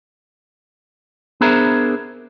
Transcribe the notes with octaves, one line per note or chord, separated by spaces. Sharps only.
B3 D4 G#4 A#4 C5 E5